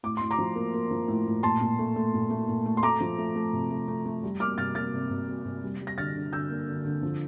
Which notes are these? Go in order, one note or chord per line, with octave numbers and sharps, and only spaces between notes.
A2 D6
A2 C6
A#5 D6
F3
A#3
A#3
F3
A2
A2
A#2 A5 C6
A#2
A3
A3
A#2
A3
A#2
A3
C6
A3 A#5 D6
F3
A3
A3
C3
A3
A3
A3
G3
A#3 D6 F6
C3 F6 A6
A#3 F6 A6
C3
C3
A#3
C3
G3
G3
A#6
D3 F6 A6
D3
D3 E6 G6
A#3
D3
D3
F3